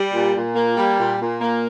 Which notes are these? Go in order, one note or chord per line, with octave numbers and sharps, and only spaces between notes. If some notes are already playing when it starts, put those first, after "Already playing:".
Already playing: G3
A#2
A#2
A#3
G3
A#2
A#2
A#3